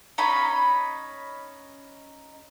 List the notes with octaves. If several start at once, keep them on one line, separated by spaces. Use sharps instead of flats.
C#4 D#4 B5